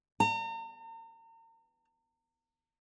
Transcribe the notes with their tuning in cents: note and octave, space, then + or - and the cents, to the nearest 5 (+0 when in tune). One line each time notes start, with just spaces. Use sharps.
A#5 -40